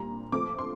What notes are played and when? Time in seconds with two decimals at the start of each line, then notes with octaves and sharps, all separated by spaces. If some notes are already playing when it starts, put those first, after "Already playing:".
Already playing: A#2 G3 D4 A#5
0.32 F3 A3 C4 D6
0.59 C6